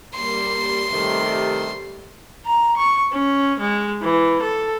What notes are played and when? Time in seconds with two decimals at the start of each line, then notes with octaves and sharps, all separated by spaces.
0.15 G3 A#3 C6
0.92 C3 D#3 G3 A3
2.46 A#5
2.77 C#6
3.12 C#4
3.60 G#3
4.02 E3
4.42 A4